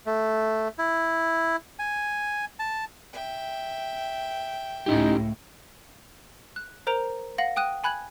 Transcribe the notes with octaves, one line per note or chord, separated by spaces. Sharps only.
A3
E4
G#5
A5
E5 G5
C#2 A2 C#4 D#4 E4 G4
F#6
A#4 C5 A#5 D7 F7
F5 F#5 A#6 F#7
G5 D#6 F#6 D#7
G#5 B5 F#6 G#6 F#7